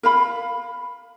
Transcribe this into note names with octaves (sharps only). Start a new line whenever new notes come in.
A#4 F5 B5